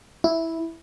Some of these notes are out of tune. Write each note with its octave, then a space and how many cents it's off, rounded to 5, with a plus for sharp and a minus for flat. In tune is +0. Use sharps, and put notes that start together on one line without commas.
E4 -5